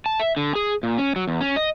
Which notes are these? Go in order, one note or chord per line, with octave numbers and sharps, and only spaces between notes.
A5
E5
D3
G#4
A#2
C#4
F#3
E2
C#4
D#5